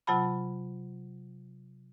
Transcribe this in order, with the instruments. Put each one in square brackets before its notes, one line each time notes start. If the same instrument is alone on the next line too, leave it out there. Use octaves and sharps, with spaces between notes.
[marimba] C3 F#3 F4 F#5 A5 B5